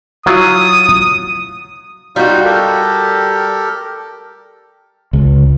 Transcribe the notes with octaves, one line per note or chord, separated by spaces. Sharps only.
F#3 E4 F4 D#6
G3 D#4 F4 F#4
G4 A4 A#4
C#2